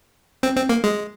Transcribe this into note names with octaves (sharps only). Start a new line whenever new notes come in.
C4
C4
A#3
G#3